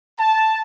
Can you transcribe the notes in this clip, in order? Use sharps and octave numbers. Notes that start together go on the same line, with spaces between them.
A5